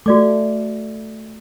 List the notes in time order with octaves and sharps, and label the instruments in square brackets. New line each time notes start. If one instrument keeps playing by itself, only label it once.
[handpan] A3 [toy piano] F#4 D5 D6